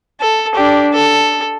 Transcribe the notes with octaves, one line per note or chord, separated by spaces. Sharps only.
A4
D4 G4
A4